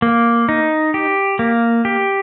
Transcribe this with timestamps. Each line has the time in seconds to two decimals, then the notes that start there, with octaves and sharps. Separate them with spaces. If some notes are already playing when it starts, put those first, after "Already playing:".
0.02 A#3
0.49 D#4
0.94 G4
1.39 A#3
1.85 G4